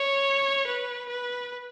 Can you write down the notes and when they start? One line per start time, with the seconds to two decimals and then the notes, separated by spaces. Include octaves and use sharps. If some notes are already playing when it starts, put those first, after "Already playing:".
Already playing: C#5
0.67 B4
1.09 B4